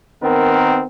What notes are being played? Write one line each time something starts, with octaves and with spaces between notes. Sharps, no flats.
D#3 B3 C4 A#4